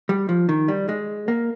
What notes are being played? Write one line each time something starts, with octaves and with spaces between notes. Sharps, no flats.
G3
F3
D#3
G3
G#3
A#3